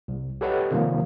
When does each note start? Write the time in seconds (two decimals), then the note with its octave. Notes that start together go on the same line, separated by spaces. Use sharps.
0.08 C2
0.41 G4 A4 B4 C#5 D#5 F#5
0.71 C3 D#3 F3 G3 A#3